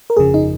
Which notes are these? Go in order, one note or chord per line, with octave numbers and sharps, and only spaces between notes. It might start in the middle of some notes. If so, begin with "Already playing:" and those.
A#4
G1 F2 C#3 F3 G#4
D#4